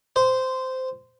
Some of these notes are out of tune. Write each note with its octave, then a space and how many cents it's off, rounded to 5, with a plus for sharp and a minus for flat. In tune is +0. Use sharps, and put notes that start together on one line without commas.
C5 -15